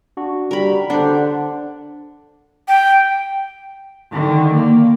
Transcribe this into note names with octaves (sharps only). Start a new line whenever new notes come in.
D4 F#4
G3 A#4 B5
D3 D4 C5 F#5
G5
D3 D#3
A#3